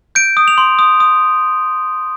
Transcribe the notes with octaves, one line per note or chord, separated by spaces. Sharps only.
G6 D7
D#6
F7
C6
D#6
D#6